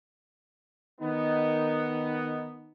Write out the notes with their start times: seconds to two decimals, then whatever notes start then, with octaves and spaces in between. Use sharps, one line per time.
1.01 D#3 B3 D#4